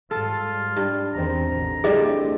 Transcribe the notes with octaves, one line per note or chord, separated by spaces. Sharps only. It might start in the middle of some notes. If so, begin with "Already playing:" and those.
G#2 G3 F4 A4
G2
E2 D#3 C4 A#5
A1 B2 D3
D3 E3 G3 A3 C4 G#4 D#5